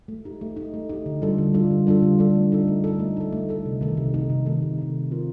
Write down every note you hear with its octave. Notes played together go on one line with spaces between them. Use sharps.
A3
D#4 G4
A3
D#4 G4
A3
D#4 G4
D3
G3 D4 F4 A4
D3
G3 D4 F4 A4
D3
G3 D4 F4 A4
D3
G3 D4 F4 A4
A3
D#4 A4
A3
D#4 A4
A3
D#4 A4
A3
D#4 A4
C3
D#3 A3 D#4 A4
C3
D#3 A3 D#4 A4
C3
D#3 A3 D#4 A4
C3
D#3 A3 D#4 A4
A3
C4 F4 A#4